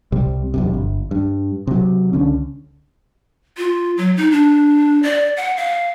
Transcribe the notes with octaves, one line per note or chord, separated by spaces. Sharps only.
C2 C3 G3
E1 B1 C3
G1
G2
C3 F#3
C#2 D3 C#4
F4
F#3
D#4
D4
D5
F#5
F5